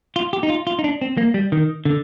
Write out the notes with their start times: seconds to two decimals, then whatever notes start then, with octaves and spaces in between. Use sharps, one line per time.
0.16 F4
0.33 G4
0.43 D#4
0.49 F4
0.67 F4
0.79 D#4
0.84 D4
1.01 C4
1.17 A#3
1.34 G3
1.52 D#3
1.85 D3